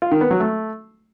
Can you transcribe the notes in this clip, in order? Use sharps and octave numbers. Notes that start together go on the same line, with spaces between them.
F4
D#3
B3
F#3
A3